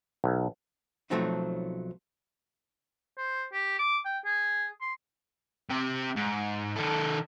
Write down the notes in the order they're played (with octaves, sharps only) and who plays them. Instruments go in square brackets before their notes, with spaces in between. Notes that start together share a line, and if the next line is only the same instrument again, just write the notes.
[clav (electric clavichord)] B1
[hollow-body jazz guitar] B1 F3 F#3 A3 C4 D#4
[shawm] C5
G4
D6
G5
G#4
C6
[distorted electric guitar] C3 G4
G#2
D#3 A4